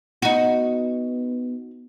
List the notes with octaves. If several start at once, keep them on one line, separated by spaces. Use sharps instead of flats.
B3 D#4 F#4